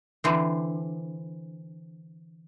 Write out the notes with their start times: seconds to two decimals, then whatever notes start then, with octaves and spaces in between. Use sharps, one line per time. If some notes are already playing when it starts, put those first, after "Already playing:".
0.24 D3 E3 C4